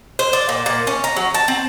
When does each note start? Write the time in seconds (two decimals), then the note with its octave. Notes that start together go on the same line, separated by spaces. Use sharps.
0.19 C5
0.33 D5
0.49 A#2
0.66 A#2
0.87 C#4
1.04 A#5
1.16 F#3
1.34 A5
1.48 C4